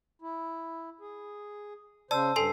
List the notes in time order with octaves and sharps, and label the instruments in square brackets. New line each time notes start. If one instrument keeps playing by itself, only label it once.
[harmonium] E4
G#4
[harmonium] C#3 C5 [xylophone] D5 [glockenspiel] A5 E6
[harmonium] G2 [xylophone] A4 G#5 C6 [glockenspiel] C7